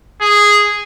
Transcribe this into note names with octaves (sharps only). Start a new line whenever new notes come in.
G#4